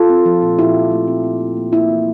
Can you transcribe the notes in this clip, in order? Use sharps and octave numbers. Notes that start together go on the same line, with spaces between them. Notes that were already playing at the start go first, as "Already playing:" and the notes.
Already playing: F4 A4
C4
F3
A#2
A#2 E4 G4
F3
A3
C4
C4
C4
A#3
A#3 E4
E3